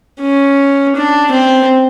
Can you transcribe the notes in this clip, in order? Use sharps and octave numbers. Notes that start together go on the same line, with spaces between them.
C#4
D4
C4